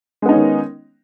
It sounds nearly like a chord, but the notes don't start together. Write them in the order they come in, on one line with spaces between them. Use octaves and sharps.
G#3 B3 D#4 C#4 D#3